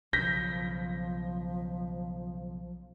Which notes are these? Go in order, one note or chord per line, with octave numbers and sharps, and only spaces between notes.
B1 C#3 F3 G6 A#6 B6